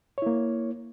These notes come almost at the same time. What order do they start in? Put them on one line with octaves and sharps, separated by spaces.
C#5 E4 A#3